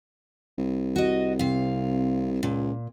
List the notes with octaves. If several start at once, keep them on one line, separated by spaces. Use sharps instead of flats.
C2
F#4 D#5
C3 F5
C#2 A#2